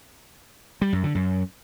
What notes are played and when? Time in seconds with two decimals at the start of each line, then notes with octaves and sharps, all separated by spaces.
0.81 G3
0.93 F#2
1.04 D3
1.15 F#2